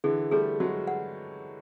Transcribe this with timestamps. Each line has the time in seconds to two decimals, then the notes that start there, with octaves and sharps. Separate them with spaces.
0.04 D3 E3 G#4
0.31 G3 A3 G#4
0.60 F#3 G#3 F#4
0.87 F#5